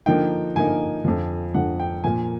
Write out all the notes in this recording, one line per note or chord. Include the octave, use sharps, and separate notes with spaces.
D3 F3 A#3 D#4 G5
D3 F3 A#3 D#4 G#5
F2 D3 F3
F2 D3 F3 F#5
G5
A#2 F3 A#3 G#5